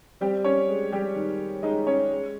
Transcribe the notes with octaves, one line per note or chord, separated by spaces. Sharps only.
G3 C4 G4
C#4 C#5
G#3
G3 G4
D#3
G#3 D#4 D#5
C#4 C#5
G#3